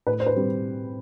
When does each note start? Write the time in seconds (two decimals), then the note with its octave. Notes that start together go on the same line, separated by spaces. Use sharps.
0.07 A2 B4
0.20 C5
0.26 B4
0.36 G3 C4